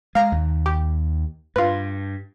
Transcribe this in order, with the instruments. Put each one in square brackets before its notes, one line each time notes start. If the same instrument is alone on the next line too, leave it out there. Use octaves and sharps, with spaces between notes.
[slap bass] G#3 [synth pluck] F5 A#5
[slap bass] D#2
[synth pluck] G4
[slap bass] G2 [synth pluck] F4 B4